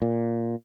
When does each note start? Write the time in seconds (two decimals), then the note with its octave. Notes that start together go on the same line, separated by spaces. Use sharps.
0.02 A#2